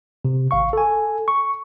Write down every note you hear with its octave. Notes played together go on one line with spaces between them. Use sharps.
C3
G#1 F5 C#6
A4 G#5
C#6